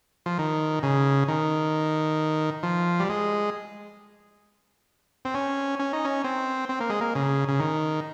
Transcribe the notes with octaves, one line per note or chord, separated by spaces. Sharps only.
F3
D#3
C#3
D#3
F3
G3
G#3
C4
C#4
C#4
D#4
C#4
C4
C4
A#3
G#3
A#3
C#3
C#3
D#3